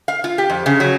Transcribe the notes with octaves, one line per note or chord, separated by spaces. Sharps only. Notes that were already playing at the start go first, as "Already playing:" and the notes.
F5
F4
G4
F2
C#3
F#3